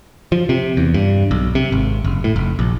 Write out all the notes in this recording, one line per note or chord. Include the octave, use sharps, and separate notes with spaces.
F3
C3
E2
G2
B1
C3
G#1
F#1
A2
F1
A#1